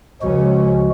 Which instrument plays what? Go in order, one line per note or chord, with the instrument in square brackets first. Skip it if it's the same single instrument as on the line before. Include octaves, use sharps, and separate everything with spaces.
[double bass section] C#2 C#4 [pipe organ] F3 G#3 F#4